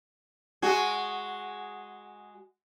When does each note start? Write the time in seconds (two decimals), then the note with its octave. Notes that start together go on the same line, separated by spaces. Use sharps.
0.62 G#3 F#4